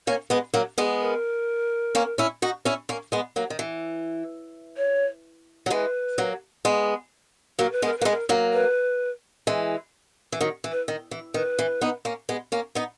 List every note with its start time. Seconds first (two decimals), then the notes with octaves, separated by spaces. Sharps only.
0.07 A#3 C#4 C#5
0.30 G#3 B3 B4
0.54 F#3 A#3 A#4
0.78 G#3 B3 G#4
1.01 A#4
1.95 A#3 C#4
2.18 C#4 E4
2.42 D#4 F#4
2.65 C#4 E4
2.89 A#3 C#4
3.12 G#3 B3
3.36 F#3 A#3
3.50 D#3
3.59 E3
4.77 C#5
5.66 F#3
5.70 E3 G#3 B4
6.18 F#3 A#3
6.65 G#3 B3
7.59 F#3 A#3 A#4
7.72 B4
7.82 G#3 B3 A#4
7.98 A#3 B4
8.05 G#3 B3
8.11 A#4
8.29 F#3 A#3
8.53 B4
9.47 E3 G#3
10.32 E3
10.41 D#3 F#3
10.64 E3
10.72 B4
10.88 D#3
11.11 E3
11.34 D#3 B4
11.59 E3
11.81 B3 D#4
12.05 A#3 C#4
12.29 G#3 B3
12.52 A#3 C#4
12.75 B3 D#4